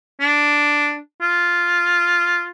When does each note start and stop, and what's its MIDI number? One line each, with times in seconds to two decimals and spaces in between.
0.20 0.98 62
1.22 2.49 65